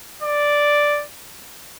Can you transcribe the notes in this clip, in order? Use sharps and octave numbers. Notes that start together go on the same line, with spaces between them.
D5